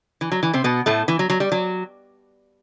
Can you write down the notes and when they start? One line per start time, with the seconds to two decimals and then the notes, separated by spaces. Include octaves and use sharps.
0.21 E3
0.32 F#3
0.43 E3
0.53 C3 C4
0.64 B2 B3
0.86 A2 A3
1.08 E3
1.19 F#3
1.30 F#3
1.40 G3
1.52 F#3